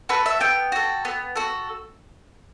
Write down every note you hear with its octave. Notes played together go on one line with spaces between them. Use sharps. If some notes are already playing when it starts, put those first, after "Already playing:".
F#4 A4 B4
E5
B3 G5
F#4 A4
B3
F#4 A4